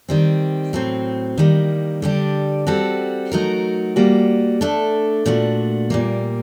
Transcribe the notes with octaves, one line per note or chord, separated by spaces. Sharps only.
D#3 G3 C4
A2 F#3 C4
D#3 G3 A#3
D3 G3 D4 G4
G3 C4 F#4 A4
F#3 A3 D#4 F#4 A#4
G3 A#3 F#4
A3 D4 A4
A#2 A3 D4 F#4
A#2 G3 A#3